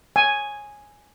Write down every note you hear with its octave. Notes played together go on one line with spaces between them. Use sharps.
G#5